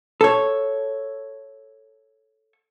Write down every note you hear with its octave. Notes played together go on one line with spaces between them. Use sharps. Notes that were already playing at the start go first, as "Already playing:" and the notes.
A4 C#5